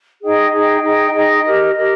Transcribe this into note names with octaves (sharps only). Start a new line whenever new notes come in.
D#4 G#4 D#5 G5
D#4 G#4 D#5 G5
D#4 G#4 D#5 G5
D#4 G#4 D#5 G5
G4 A#4 D#5
G4 A#4 D#5